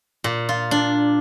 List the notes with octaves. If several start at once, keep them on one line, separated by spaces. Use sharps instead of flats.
A#2
F4
D4